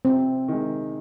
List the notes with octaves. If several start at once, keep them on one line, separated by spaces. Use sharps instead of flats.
C3 C4
D#3 G#3